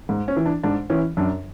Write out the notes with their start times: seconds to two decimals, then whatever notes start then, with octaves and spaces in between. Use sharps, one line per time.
0.09 G#2
0.28 C#4
0.37 E3
0.46 D4
0.63 G#2 D4
0.90 E3 C#4
1.17 F#2 D4